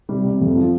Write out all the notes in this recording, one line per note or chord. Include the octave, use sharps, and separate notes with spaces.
C3 G3
C3
F2
F3